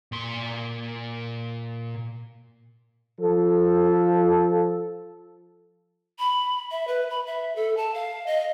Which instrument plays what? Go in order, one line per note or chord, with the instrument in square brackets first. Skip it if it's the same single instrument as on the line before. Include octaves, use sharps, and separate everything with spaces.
[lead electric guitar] A#2 C6
[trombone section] F3 A4
[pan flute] B5
E5
B4
B5
E5
A4
A5
F5
D#5